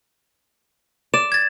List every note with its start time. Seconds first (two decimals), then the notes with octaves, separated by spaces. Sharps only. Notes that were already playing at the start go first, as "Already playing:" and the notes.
1.14 D5 E7
1.32 G#6 A6